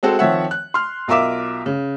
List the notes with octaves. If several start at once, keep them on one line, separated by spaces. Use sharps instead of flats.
G#3 C4 F#4 A4
D#3 F3 C4 C#5 E5 F#5
F#6
C6 F6
B1 F4 A#4 E5 D6 E7
C#3